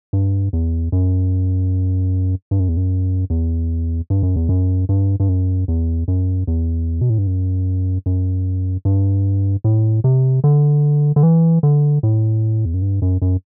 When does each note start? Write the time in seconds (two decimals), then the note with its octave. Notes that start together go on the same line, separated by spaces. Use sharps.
0.13 G2
0.53 E2
0.92 F#2
2.51 G2
2.60 F#2
2.68 E2
2.77 F#2
3.30 E2
4.10 G2
4.23 F#2
4.36 E2
4.49 F#2
4.89 G2
5.20 G2
5.29 F#2
5.68 E2
6.08 F#2
6.47 E2
7.01 B2
7.10 A2
7.18 G2
7.27 F#2
8.06 F#2
8.85 G2
9.64 A2
10.04 C3
10.44 D3
11.16 D3
11.23 E3
11.63 D3
12.03 A2
12.65 E2
12.74 F#2
12.82 G2
13.02 F#2
13.22 F#2